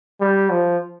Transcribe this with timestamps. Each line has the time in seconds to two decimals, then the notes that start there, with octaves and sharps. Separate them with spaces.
0.21 G3
0.50 F3